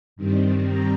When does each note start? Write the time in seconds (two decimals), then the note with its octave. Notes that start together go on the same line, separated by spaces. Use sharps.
0.16 G2 D#3 G3 C4
0.67 A#5